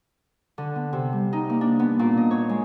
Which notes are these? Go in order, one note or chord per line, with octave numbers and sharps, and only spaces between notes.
D3
B3
C3
G3
D#4
A#3
D4
B3
A#2
D#5
C#5
G#3